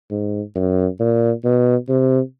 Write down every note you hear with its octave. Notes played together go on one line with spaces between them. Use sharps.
G#2
F#2
A#2
B2
C3